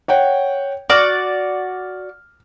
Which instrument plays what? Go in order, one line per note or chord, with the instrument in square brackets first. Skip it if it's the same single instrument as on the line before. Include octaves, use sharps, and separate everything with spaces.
[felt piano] C#5 F#5 G5
[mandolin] F#4 D5 [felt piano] F6